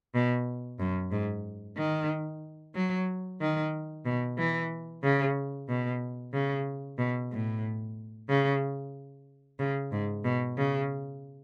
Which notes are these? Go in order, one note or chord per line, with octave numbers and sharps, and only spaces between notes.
B2
F#2
G#2
D#3
F#3
D#3
B2
E3
C#3
B2
C#3
B2
A2
C#3
C#3
G#2
B2
C#3